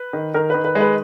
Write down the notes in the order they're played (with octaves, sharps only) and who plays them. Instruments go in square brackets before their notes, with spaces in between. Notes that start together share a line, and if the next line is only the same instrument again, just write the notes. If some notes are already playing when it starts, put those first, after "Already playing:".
Already playing: [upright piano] B4
D#3
D#3 A#4
D#3 B4
B4
G#3 B4